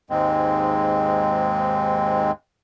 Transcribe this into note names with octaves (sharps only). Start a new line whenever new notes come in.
D#2 G#2 G#3 C4